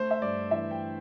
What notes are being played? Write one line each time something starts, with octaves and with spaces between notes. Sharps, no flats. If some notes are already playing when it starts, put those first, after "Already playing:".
Already playing: A3 C5
E5
G2 D5
E3 E5
G5